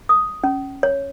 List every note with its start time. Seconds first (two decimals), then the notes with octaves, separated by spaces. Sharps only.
0.09 D#6
0.44 C#4
0.83 C#5